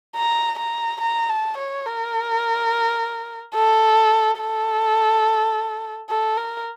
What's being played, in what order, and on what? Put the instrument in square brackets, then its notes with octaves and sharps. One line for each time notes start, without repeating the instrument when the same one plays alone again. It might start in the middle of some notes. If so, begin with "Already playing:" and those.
[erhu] A#5
A#5
A#5
A5
C#5
A#4
A4
A4
A4
A#4